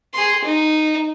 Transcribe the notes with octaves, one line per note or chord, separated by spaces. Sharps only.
G#4 C6
D#4